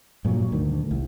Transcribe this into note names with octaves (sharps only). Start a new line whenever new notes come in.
G2 A#2 E3 F#3
D2 D#3
C2